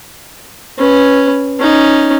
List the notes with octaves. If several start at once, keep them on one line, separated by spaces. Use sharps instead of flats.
C#4 B4
C#4 D#4